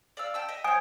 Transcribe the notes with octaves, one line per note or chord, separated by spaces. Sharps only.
D5 F5 E6
G5 A5 E6
D#5 E5
C5 C#5 G#5 D#6